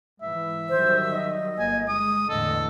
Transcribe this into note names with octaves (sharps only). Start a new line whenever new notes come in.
G#2 E3 E5
D#3 F#3 G3 C5
D#5
G1 A#3 G#5
G#3 D#6
E2 A2 D3 A4 D#5